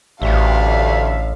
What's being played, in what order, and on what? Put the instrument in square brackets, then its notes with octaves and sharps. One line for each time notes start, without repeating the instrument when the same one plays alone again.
[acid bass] A1 [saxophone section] D2 G2 D3 [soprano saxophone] E5 [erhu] F5